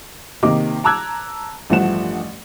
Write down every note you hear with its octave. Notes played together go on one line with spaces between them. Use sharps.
C3 D#3 A#3 D#5 D6
A5 A#5 D6 E6 F#6 G#6
A1 G2 F3 A3 F#5 E7